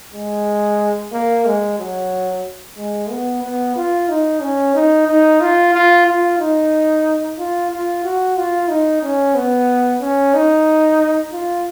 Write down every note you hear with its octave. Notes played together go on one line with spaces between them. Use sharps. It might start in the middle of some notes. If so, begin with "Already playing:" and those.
G#3
A#3
G#3
F#3
G#3
B3
B3
F4
D#4
C#4
D#4
D#4
F4
F4
F4
D#4
F4
F4
F#4
F4
D#4
C#4
B3
C#4
D#4
F4